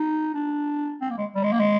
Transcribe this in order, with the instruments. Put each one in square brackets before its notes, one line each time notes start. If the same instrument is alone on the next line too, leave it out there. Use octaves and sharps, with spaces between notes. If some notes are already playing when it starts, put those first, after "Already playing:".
Already playing: [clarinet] D#4
D4
C4
A#3
G#3
G3
G#3
A#3
G#3